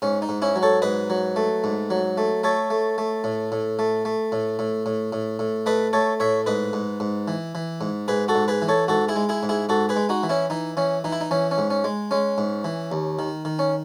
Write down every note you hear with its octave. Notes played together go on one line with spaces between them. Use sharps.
G#2 C#4
D#4
G#2
C#4 E4
F#3
A4 C#5
G#2 B4 D#5
F#3
A3
G#2
F#3
A3
A3 A4 C#5
A3
A3
A2
A2
A3
A3
A2
A2
A2
A2
A2
A3 B4 D#5
A3 A4 C#5
A2 C#5 E5
G#2 B4 D#5
G#2
G#2
E3
E3
G#2
G#2 G#4 B4
F#4 A4
G#2
G#4 B4
E3
A4 C#5
G#2 F#4 A4
E4 G#4
G#3
E4 G#4
G#2
E4 G#4
G#2 F#4 A4
G#4 B4
G#3
D#4 F#4
E3
C#4 E4
E3 D#4
E3 C#4
E3 D#4
E4
D#4
E3 C#4
C#4
G#2
C#4
G#3
G#3 C#4
G#2
E3
D#2
D#3
D#3
C#4